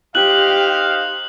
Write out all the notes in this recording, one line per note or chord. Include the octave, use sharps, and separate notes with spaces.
D#4 G4 C5 F5 F#6 F#7